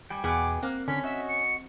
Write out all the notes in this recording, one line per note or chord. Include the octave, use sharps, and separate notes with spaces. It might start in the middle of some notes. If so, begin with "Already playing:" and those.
G3 G5 G#5
E2 B2 B3 G#4 D6
A#3 C4 F#6
D3 C#4 B6
F#4 D#5 E5
C#7